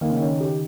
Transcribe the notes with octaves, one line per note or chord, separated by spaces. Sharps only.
D#3 A#3
C#3
D#3
C#4
G4